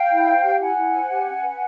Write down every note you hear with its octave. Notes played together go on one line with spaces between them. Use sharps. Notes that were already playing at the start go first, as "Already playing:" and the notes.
Already playing: F5 G5
E4
C5
G4
E4 F#5 G#5
E4
C5
G4
C#4
B4